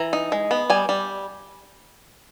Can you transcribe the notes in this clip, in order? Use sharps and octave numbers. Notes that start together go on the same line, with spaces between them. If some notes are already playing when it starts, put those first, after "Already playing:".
Already playing: E3 A#5
D#4
G#3
B3
G3 G#5
G3